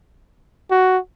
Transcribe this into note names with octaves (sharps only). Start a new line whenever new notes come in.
F#4